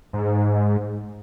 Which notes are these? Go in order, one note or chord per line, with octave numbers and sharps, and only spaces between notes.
G#2